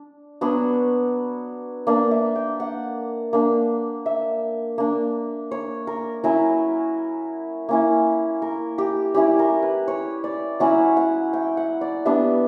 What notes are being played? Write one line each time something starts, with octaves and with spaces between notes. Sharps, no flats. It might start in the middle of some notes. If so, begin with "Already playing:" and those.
Already playing: D4
F#3 B3 D4 C#5
A#3 D4 D5
E5
G5
F#5
A#3 D4
E5
A#3 D4
C#5
A#4
F#3 C#4 E4 A#4
A#3 C#4 E4
A#4
G4
G3 C#4 E4 G4
A#4
B4
C#5
D5
F#3 C#4 E4 F#5
F#5
G5
F#5
D5
G3 B3 D4 E5